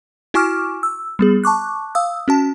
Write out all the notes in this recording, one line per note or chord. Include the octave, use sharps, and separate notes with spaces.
E4 F#4 G#5 C#6 D6 F6
E6
G3 B3 G#4
A5 C#6 D6 F#6
F5 D#6 E6
C#4 F#4 A5